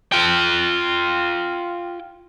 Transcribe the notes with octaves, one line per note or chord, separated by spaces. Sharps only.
F4 G5